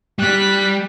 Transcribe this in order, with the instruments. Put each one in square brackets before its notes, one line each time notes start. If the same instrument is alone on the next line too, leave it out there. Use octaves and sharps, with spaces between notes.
[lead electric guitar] G3 [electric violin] F#6 B6